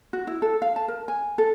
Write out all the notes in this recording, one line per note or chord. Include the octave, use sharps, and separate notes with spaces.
F#4
E4
A4
F5
A5
A#4
G#5
A4